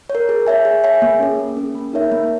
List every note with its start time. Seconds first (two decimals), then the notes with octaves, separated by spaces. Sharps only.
0.10 C#5
0.15 A#4
0.29 G#4
0.47 C#5 E5 G#5
0.65 G#4
0.84 C#5 E5 G#5
1.02 A#3
1.20 C#4 G#4
1.39 A#3
1.57 C#4 G#4
1.75 A#3
1.93 D#4 A#4 C#5 E5
2.12 A#3